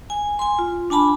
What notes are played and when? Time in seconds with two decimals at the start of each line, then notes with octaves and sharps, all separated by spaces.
0.10 G#5
0.39 G#5 C6
0.59 F4
0.90 D4 G#5 A5 B5